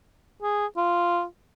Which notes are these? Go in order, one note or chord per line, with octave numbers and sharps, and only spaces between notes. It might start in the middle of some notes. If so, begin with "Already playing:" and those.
G#4
F4